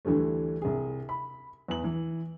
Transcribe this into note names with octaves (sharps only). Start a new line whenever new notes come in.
D2 D3 E3 G3 A3
C2 G#4
B5
E2 B4 F#7
E3